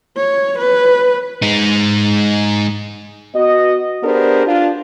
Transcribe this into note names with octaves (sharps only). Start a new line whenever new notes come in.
C#5
B4
G#3 D#4
B3 F#4 D#5
B3 D4 G4 G#4 A#4 C5
D4 F4